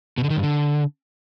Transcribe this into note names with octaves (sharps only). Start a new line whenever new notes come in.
B2
D3
D#3
G2
D3